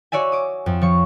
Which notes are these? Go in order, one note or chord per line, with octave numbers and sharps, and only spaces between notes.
F#4 C#5 D5 E5 G#5
D6 D#6
F2
F3 C#5 C#6